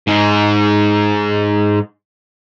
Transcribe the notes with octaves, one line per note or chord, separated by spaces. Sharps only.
G#2 G#3